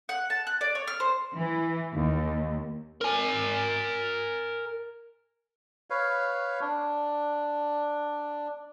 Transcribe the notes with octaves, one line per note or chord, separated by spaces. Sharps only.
F#5
A5
F#6
D5
C#5
F6
C5
E3
D#2
A#4 G#5
B4 C#5 F5
D4